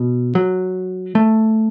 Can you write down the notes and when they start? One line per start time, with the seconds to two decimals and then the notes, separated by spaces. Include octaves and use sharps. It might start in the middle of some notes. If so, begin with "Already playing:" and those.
Already playing: B2
0.35 F#3
1.15 A3